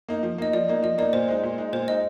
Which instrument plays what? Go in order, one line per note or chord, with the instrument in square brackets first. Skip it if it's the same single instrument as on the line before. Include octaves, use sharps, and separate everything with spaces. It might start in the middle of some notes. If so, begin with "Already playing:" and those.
[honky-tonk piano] A#3 D#4
F3
[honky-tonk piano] A#3 D#4 [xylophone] D#5
[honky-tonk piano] F3 [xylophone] D5
[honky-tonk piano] A#3 D#4
[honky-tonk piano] F3 [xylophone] D#5
[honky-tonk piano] A#3 D#4 [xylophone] D5
[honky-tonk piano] A#2 [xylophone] C5
[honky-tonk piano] G#3 D#4
A#2
G#3 D#4
[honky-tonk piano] A#2 [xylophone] C5
[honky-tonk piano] G#3 D#4 [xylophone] D#5